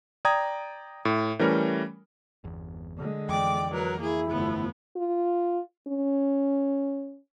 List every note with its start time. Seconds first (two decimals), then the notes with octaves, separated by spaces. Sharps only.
0.25 D5 G5 A#5 D#6 G#6
1.05 A2
1.39 E3 G3 A3 C#4 A#4
2.44 G1 E2
2.97 D3 G#3
3.29 F2 E3 D5 G5 D6
3.72 F#3 A#4 B4
4.01 A#3 E4 G#4
4.30 G1 F3 A3 B3
4.96 F4
5.87 C#4